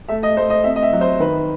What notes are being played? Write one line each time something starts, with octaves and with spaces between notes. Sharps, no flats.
A3 E5
D#5
A3 C5
D#5
C4 E5
D#5
E5
F#3
C5
D#3 B4